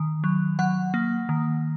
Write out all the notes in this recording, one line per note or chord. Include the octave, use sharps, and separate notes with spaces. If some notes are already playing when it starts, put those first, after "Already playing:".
Already playing: D#3
F#3
F#3 F#5
A#3
D#3